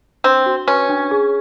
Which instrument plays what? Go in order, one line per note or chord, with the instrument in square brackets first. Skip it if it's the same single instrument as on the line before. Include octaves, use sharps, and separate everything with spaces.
[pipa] C4 [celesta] D4
[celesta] F#4
[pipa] C#4 [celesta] B4
[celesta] D4
G#4